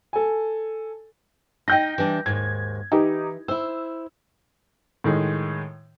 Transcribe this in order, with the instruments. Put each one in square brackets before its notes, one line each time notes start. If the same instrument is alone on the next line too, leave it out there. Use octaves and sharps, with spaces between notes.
[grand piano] A4 G#5
[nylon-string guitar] D#4 D#5 [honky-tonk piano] G5 G6 A#6
[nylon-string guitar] E3 G3 D4
[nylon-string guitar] D#2 G#2 [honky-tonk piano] G#6
[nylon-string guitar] E3 [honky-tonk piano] D#4 G4
[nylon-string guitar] E4 C5 [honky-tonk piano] E6
[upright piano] A2 D#3 G#3